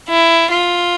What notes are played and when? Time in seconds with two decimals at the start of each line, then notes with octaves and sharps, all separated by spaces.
0.09 E4
0.50 F4